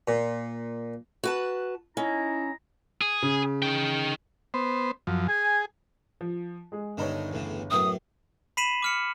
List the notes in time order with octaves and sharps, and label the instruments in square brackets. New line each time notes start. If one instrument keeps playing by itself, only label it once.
[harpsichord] A#2
[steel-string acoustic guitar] F#4 B4 A5
[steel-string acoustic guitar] C#4 [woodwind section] D#4 E4 A#5
[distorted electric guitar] G#4
[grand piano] C#3
[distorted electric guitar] D#4 G5
[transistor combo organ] B3 C5
F#2 F3
[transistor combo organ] G#4 [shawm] G#5
[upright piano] F3
G#3 G#4
[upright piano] G1 B4 C#5 [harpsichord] D#3 D4 D#4
[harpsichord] E2 A2 C#3
[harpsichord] F#2 A2 B3 [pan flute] D#6
[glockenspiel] B5 B6 C7 D#7 E7 F#7
D6 F6 C#7